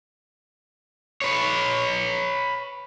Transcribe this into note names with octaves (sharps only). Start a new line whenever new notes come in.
B4 C#5